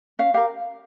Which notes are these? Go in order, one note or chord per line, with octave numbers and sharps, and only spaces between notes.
C#4 F5
G4 A#4 F5